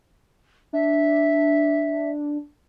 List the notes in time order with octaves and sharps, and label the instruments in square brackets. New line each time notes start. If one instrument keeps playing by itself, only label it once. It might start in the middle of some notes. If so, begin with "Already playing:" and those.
[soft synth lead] D4 [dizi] E5